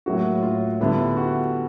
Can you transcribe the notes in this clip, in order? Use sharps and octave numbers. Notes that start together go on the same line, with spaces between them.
A2 F#3 A#3 F#4
F4
D3 G3 B3 E4
F#4